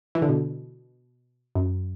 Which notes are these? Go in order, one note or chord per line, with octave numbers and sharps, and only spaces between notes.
E3
D3
B2
F#2